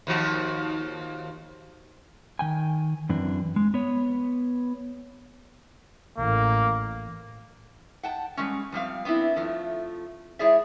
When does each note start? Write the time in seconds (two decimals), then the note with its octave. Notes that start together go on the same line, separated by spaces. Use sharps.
0.07 D#2 F3 F#4
2.39 D#3 G5 G#5
3.09 F#2 E3 C4 D4
3.56 G#3
3.74 B3 C#5
6.18 A1 A#3
8.03 F#5 G5 A5
8.37 G3 G#3 C#4
8.72 F3 G3 C4 F5
9.05 B3 C4 D4 E4
9.36 F2 F3 A3
10.39 G#3 E4 G#4 C#5 D5 E5